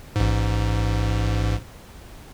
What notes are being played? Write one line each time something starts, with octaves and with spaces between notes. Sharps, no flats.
A1 G#2